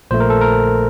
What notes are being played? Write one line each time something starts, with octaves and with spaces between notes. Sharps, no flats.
A#1 A#2 A3 C5
A#4
A4
A#4